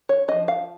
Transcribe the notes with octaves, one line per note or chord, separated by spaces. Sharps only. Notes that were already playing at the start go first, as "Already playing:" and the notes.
C#5
F3 C#4 D#5
F5